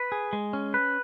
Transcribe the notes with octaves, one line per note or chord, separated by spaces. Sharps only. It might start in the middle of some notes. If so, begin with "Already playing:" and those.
Already playing: B4
G#4
G#3
C#4
B4